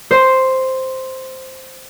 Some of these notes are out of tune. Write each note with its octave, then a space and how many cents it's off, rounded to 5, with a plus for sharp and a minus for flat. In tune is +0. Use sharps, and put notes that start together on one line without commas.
C5 +0